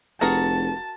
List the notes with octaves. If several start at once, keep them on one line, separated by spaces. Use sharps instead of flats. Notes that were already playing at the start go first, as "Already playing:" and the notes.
F1 F#4 G#4 A#4 B4 F#5 A5 A#5